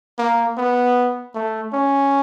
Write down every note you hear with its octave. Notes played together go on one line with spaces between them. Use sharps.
A#3
B3
A3
C#4